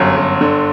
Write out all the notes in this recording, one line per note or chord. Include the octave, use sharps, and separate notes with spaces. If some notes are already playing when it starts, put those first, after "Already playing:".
Already playing: G1 F#2
G1
D3